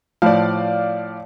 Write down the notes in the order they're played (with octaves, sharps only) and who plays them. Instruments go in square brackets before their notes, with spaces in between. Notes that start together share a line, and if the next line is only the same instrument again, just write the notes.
[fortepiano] A2 F3 [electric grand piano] D5 F5